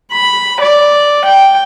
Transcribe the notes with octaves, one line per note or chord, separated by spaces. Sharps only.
B5
D5
G5